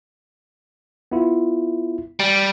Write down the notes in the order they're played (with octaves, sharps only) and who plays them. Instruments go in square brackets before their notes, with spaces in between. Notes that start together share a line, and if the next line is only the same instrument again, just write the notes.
[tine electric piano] B3 E4 F4
[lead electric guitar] G3